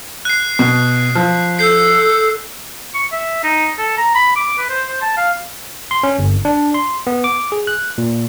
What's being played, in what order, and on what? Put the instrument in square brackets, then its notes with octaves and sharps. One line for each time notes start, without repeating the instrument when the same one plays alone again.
[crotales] F#6 C7
[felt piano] B2
F3
[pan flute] A4 [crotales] G6 C7
[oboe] C#6
E5
D#4
A4
A#5
B5
D6
B4
C5
C5
A5
F5
[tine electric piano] C6
C#4
G1
D4
C6
B3
D6
G#4
F#6
A#2